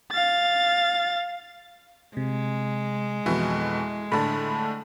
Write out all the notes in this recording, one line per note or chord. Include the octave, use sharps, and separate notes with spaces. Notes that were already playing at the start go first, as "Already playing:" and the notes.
F5 A6
C3 G#3
F2 B2 E3 E4
A2 D3 A5 B5